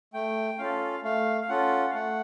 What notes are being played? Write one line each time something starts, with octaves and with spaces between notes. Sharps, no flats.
A3 G5
C#4 F4 A4 F5
A3 F5
F5
C#4 F4 A4 F#5
F5
A3 F#5